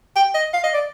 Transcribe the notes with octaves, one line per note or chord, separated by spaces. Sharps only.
G5
D#5
F5
D#5
D5